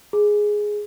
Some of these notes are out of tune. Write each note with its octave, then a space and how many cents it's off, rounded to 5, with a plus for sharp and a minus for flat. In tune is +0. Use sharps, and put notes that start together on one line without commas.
G#4 +5